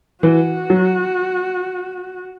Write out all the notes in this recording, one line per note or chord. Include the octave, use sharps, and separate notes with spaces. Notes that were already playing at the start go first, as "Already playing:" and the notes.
E3 F#4
F#3